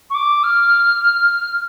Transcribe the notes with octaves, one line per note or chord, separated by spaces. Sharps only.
C#6
D6
F6